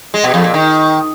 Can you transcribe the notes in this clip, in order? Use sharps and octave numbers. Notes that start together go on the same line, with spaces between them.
G#3
B2
F2
A#2
D#3